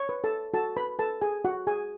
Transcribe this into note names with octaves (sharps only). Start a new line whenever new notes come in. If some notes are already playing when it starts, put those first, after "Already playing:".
Already playing: C#5 C#6
B4
A4 A5
F#4 A4 A5
B4 B5
A4 B4 A5
G#4 G#5
F#4 F#5
G#4 G#5